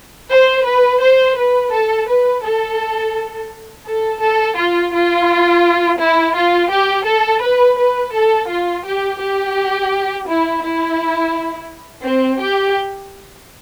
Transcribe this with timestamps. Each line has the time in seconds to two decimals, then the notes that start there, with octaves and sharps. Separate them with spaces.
0.29 C5
0.65 B4
1.01 C5
1.36 B4
1.72 A4
2.07 B4
2.43 A4
3.86 A4
4.21 A4
4.57 F4
4.93 F4
5.99 E4
6.36 F4
6.70 G4
7.06 A4
7.42 B4
7.78 B4
8.13 A4
8.48 F4
8.85 G4
9.20 G4
10.27 E4
10.63 E4
12.04 C4
12.41 G4